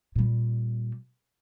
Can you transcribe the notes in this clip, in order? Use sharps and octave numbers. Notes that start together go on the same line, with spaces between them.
A#2 G3